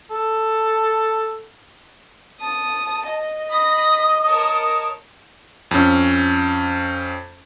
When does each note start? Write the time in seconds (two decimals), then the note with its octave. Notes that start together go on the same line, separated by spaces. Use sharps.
0.11 A4
2.40 A5 D#6
3.08 D#5
3.49 B5 D#6 A#6
4.25 A#4 C#5 A5
5.71 F2 C#4